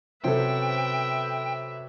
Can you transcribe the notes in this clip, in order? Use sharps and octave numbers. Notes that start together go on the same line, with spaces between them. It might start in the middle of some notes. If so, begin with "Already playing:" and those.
C3 F#3 C#4 A4 B4 C5 E5 G5